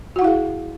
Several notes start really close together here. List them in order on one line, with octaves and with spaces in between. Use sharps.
F#4 F#5 E4 F5 G#4